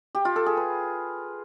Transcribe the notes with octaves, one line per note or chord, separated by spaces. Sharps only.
G4
F4
A4
G#4
B4